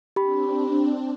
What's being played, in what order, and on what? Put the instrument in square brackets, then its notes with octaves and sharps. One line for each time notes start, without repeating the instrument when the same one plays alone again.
[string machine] C4 D4 [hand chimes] G4 B5